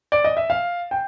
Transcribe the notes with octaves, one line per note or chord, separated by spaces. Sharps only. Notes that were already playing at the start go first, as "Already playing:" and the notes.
D5
D#5
E5
F5
G5